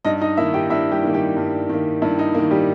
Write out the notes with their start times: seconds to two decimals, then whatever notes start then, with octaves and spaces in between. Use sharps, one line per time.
0.05 G2 D#4 D#5
0.21 D#4 D#5
0.37 D#3 A#3 E4 E5
0.54 G4 G5
0.70 G2 E4 E5
0.92 G3 G4
1.03 D#3 A#3
1.14 G3 G4
1.36 G2
1.69 D#3 A#3
2.02 G2 E4
2.19 D#4
2.35 D#3 A#3
2.51 G3 G4